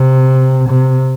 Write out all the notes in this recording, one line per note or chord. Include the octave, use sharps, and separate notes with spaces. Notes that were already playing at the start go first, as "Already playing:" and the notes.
Already playing: C3
C3